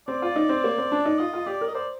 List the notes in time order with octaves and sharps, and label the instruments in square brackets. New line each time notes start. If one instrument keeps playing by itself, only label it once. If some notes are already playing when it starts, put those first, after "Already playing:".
[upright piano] C4 [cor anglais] D5
[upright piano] F4
D#4
C4
A#3
C4
D4
D#4
[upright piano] F4 [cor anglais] D#5
[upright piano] F4
[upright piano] G4 [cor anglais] D5
[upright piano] A#4
[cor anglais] D#5
[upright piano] C5 [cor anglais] D5